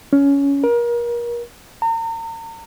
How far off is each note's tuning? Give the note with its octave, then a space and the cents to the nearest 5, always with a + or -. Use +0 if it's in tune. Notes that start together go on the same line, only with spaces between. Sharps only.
C#4 +15
A#4 +30
A#5 -40